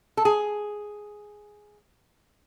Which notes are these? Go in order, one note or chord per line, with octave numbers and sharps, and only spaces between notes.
A4
G#4